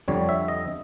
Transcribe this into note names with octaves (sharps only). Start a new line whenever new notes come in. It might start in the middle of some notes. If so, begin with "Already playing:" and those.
F2 D3 G3 C#5
E5
D#5